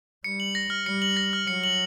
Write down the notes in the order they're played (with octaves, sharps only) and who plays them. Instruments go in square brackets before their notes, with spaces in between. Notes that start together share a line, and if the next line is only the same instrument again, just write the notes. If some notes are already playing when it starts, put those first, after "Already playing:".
[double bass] G3 [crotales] C#7
[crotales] F#7
A#6
F6
[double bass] G3 [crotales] C#7
[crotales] F#7
A#6
F6
[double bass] F#3 [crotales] C#7
[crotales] F#7